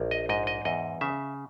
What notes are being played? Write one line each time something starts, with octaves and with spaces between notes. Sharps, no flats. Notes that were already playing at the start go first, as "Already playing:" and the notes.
Already playing: A#1
D#5
G#2 D#5
D#5
E2 D#5
C#3 E5